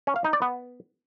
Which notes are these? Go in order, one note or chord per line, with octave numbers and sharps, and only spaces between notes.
C#4
F5
D#4
D5
B3